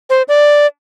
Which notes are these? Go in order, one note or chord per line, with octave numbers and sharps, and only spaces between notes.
C5
D5